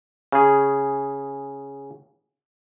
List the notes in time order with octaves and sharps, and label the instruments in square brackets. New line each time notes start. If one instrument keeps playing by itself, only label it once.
[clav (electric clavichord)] C#3 G#4